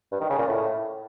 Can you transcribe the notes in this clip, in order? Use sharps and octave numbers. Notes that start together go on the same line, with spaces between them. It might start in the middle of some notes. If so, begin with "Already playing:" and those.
G2
D#3
C#3
A#2
A2